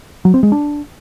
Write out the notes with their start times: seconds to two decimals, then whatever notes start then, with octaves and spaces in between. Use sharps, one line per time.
0.25 F#3
0.34 C4
0.43 G#3
0.52 D4